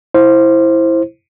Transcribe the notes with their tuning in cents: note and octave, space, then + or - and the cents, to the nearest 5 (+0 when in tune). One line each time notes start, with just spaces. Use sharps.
E4 +0 C5 +10